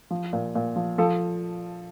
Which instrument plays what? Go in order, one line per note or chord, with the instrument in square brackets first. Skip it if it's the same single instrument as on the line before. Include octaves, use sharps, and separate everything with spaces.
[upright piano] F3
A#2
A#2
F3
F3 A4